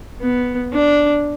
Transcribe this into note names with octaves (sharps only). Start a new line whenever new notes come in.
B3
D4